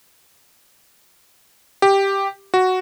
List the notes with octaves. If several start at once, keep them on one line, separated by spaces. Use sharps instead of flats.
G4
F#4